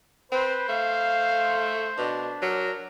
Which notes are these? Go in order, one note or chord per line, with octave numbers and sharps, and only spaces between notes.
C4 B4 C5
A3 F5
B2 D4
F#3 A#4